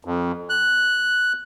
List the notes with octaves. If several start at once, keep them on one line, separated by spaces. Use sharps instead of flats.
F2
F#6